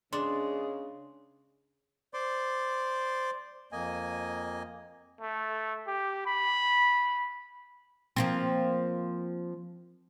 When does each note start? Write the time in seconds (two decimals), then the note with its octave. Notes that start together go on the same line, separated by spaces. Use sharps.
0.13 C#3 G#3 B3 D4 G#4 C6
2.14 C5 D5 C6 D6
3.72 F2 A#3 D#5 G#5
5.21 A3
5.87 G4
6.26 B5
8.16 F3 A#3 C4